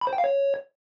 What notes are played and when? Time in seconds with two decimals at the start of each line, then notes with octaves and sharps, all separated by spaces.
0.01 B5
0.07 C5
0.13 G5
0.18 F5
0.24 C#5